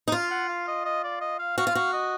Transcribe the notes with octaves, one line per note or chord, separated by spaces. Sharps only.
D#4
F4 F5
F#5
F5
D#5
D#5
D5
D#5
F5
F#4 F5
F4
F#4
D#5